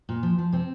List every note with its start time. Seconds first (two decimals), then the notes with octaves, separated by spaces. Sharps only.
0.09 A#2
0.23 F3
0.38 F3
0.52 C3 C4